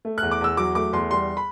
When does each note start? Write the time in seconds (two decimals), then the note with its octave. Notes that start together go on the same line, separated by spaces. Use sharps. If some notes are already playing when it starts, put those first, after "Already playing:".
0.05 A3
0.18 E2 F#6
0.31 D6
0.41 E2 E6
0.57 F#3 D6
0.75 A3 D6
0.93 E2 C6
1.11 G3 C6
1.37 B5